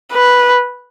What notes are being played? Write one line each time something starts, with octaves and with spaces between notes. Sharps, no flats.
B4